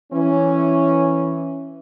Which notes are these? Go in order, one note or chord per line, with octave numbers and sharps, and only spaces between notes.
E3 C#4